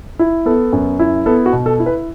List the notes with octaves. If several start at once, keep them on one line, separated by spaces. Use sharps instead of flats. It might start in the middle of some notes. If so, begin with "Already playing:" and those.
E4
B3 A4
F#2
E4
B3 A4
F#4
B2
A4
E4
B4